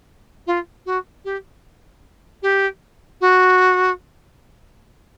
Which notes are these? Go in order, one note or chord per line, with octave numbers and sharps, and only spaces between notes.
F4
F#4
G4
G4
F#4